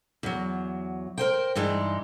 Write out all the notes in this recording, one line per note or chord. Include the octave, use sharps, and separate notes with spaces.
E2 F#3
A#4 C5 G5
G2 E3 G#3 D#4